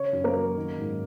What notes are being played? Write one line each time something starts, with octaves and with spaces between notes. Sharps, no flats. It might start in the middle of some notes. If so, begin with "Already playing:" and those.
Already playing: C#3 C#5
F#2
A#3 A#4
F#3
D#3
G#2